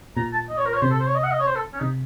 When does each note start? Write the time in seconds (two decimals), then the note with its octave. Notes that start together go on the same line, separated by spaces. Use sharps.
0.17 A#2 A#5
0.33 A5
0.49 D#5
0.58 C#5
0.66 A#4
0.74 C#5
0.82 C3 C5
0.91 A4
0.99 C5
1.07 C#5
1.15 D#5
1.23 F#5
1.31 D#5
1.40 C#5
1.47 C5
1.56 A4
1.73 C#4
1.80 C3 D#4